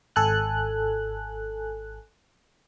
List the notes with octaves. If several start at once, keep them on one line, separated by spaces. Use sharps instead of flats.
G#1 A4 G#5 F#6